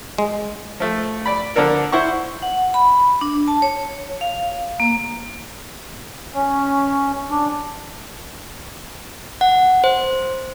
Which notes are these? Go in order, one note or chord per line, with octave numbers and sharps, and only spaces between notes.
G#3
F3 A3
D5 B5
D3 F3 D4 A4 A#4
E4 C5 F#5 C#6
F#5
B5
D4
A5
C#5
F5
A#3
C#4
D4
F#5
C5